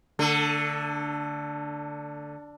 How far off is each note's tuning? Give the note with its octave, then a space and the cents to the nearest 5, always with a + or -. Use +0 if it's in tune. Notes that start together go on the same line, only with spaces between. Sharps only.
D3 +0 A3 +35